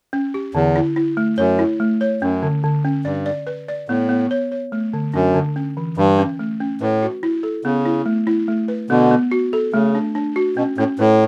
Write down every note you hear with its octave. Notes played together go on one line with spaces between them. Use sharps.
C#4
G4
E2 D3
E4
E4
A3
F#2 C#5
E4
A3
C#5
F#2 C#4
D3
D3
C#4
G2 D5
D5
B4
D5
A2 B3
B3
C#5
C#5
A3
D3
F#2 D4
D3
C#4
E3
G2 E3
C#4
A3
C#4
A2 B4
F#4
E4
A4
C#3 B3
E4
A3
E4
A3
B4
B2 D3 B3
B3
F#4
A4
C#3 A3
D4
D4
F#4
B2 C#4
A2 C#4
A2 B4